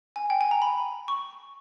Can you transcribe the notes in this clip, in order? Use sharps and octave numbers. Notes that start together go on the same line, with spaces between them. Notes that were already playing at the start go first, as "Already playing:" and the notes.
G#5
G5
G#5
A#5
B5
C#6